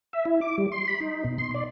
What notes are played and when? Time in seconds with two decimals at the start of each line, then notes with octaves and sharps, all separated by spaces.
0.13 E5
0.25 E4
0.41 D6
0.58 G3
0.72 C6
0.88 B5
1.00 D#4
1.24 B2
1.38 C6
1.54 D5